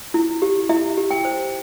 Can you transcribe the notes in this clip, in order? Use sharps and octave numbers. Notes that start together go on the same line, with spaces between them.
E4
G4
E4 E5
G4
G5
C5